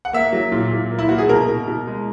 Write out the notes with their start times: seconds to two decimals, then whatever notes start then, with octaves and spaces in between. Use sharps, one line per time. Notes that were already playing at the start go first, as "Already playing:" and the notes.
0.05 F#5
0.13 A#3 E5
0.32 F#3
0.52 A#2
0.71 A#2
0.91 A#3
0.99 E4
1.09 A#3 F#4
1.18 G#4
1.29 B2 A#4
1.49 B2
1.68 B2
1.87 G#3